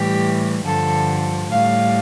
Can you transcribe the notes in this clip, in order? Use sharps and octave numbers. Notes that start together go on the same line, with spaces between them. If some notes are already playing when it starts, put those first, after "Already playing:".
Already playing: A2 E3 G3 G4
G2 D3 F3 A4
A2 G3 F5